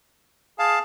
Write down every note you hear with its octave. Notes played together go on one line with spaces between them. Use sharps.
G#4 F5 A5